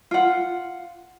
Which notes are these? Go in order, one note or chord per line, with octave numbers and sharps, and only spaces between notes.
F4 F#5